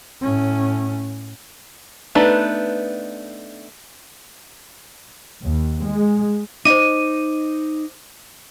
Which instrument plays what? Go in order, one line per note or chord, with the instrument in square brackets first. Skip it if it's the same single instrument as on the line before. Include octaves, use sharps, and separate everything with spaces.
[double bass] A2 C#4
[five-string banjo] A3 B3 D4 D#4 B4
[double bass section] D#2
G#3
[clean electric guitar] D#4 D#5 [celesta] C5 D6 [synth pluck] D#7